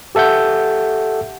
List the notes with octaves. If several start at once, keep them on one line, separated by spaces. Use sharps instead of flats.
G4 A4 E5 F#5 G6